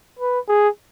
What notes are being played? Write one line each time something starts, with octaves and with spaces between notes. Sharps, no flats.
B4
G#4